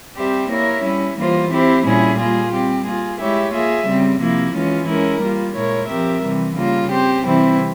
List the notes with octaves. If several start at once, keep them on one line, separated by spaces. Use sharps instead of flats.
G3 C4 G4 C5 E5
A#3 E4 A#4 C#5 E5
G3 C#4 E4
E3 G3 A#3 F4 C5
C4 E4 G4 C5
A#2 G3 C#4 E4 G#4
G3 A#3 F4 G#4
G3 C4 G4
A#3 F4 G#4
G#3 E4 G4 C#5 E5
A#3 F4 G#4 E5
C#3 G3 C4
C3 F3 A#3 E4
E3 G#3 C#4 F4
G#3 C#4 E4 A#4
G3 A#3 F4
A#2 G#3 E4 A#4 C#5
F3 C4 G4 A#4 E5
C3 E3 G3
C#3 G3 A#3 F4
C4 G4 C5
C3 E3 G3 C4 E4